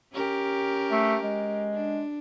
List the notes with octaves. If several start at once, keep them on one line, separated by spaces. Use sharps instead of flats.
C#4 G4 A#4
A3
G#3
D4